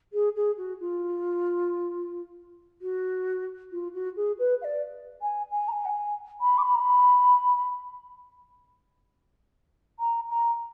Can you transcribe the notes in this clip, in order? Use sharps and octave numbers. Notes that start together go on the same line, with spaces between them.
G#4
G#4
F#4
F4
F#4
F4
F#4
G#4
B4
F5
D5
G#5
G#5
A#5
G#5
F#5
G#5
B5
D6
B5
A#5
B5
A#5
A#5